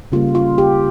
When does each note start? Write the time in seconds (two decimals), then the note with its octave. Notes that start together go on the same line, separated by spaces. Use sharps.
0.12 C#3 G3 A#3 F4
0.35 F4
0.58 G4